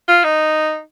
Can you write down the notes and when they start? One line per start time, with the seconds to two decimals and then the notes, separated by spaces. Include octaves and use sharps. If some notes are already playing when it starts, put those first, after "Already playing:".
0.08 F4
0.24 D#4